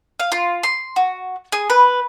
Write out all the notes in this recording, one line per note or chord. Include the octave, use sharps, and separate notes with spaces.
F5
F4
C6
F#4
G#4
B4